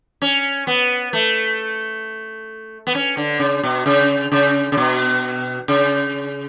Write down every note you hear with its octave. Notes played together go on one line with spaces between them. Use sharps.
C#4
B3
A3
B3
C#4
D3
C#3
B2
C#3
C#3
C#3
B2
C#3